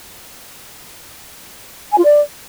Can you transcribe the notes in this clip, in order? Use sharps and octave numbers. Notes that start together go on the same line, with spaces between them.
G#5
F4
D5